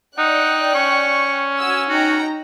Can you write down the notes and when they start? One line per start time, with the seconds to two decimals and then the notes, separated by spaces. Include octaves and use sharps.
0.18 D#4 D5 F#5 G5 F#6
0.75 C#4 C#6
1.60 F#4 G#5 E6
1.89 D#4 F#4 G5 A#5